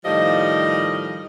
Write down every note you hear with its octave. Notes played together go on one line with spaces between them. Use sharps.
A2 D#3 F3 G3 D#5